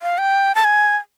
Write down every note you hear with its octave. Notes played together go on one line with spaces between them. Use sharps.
F5
G5
A5
G#5